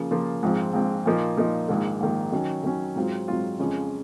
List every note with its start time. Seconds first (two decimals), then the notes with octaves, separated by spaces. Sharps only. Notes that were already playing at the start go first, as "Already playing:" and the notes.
Already playing: C#3 F3 A#3 F4
0.11 C#3 F3 A#3 F4
0.43 A#1 G#2 F3 C4
0.73 A#1 G#2 F3 C4
1.06 A#2 F3 A#3 D#4
1.37 A#2 F3 A#3 D#4
1.69 A#1 G#2 D#3 A#3
2.00 A#1 G#2 D#3 A#3
2.32 D#3 F#3 C#4
2.64 D#3 F#3 C#4
2.96 G#2 F#3 C4 F4
3.28 G#2 F#3 C4 F4
3.59 F2 C#3 F3 G#3 C#4